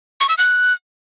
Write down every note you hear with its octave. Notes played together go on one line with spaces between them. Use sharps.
C#6
E6
F#6